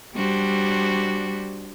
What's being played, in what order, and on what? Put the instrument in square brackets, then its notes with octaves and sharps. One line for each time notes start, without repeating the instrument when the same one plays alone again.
[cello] G3 [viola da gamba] D4 F#4 C5